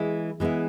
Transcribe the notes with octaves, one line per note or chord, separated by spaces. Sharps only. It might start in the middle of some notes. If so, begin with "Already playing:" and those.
Already playing: E3 G#3 B3 E4
E3 G#3 B3 E4